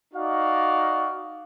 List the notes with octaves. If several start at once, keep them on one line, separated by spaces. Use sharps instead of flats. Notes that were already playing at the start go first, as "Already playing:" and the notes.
D#4 F#4 D5 F5